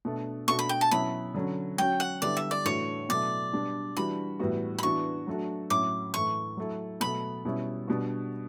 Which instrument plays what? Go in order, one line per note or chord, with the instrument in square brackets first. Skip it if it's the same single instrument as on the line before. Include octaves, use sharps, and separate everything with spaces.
[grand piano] B2 A3 D4
[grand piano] B2 A3 D4 F#4 [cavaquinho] C#6
[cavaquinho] B5
G5
A5
[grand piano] B2 F#3 C#4 E4 [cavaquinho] B5
[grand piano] D3 F#3 C#4
[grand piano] F#3 C#4 F#4 [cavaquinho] G5
[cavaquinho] F#5
[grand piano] D3 G3 B3 E4 [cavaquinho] D5
[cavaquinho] E5
D5
[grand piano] A2 E3 A3 D4 F#4 [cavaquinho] C#5
[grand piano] B2 F#3 A3 E4 [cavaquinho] D5
[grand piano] B2 G3 D4
[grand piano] E3 G3 D4 F#4 [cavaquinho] B5
[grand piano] A2 E3 G3 B3 F#4
[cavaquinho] B5
[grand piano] E3 B3 D4 F#4 [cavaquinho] C#6
[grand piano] F#3 A3 D4 F#4
[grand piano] A2 F#3 C#4 E4 [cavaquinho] D6
[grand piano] A2 E3 A3 E4 [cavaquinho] C#6
[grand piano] F#3 A3 E4
[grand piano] B2 F#3 A3 [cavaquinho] B5
[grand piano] B2 G3 C#4 E4
B2 G3 D4 F#4